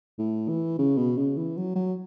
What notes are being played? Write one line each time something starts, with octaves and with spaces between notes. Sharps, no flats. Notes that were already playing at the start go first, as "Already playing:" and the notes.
A2
E3
C#3
B2
C#3
E3
F#3
F#3